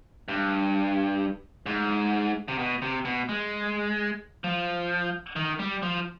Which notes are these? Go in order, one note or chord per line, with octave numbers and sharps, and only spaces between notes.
G2
G#2
C3
B2
C3
B2
G#3
F3
D#3
G3
F3